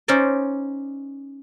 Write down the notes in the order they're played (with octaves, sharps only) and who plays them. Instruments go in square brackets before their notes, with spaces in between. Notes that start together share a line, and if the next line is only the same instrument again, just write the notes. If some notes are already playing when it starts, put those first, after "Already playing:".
[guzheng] C#4 D#4 C5 D5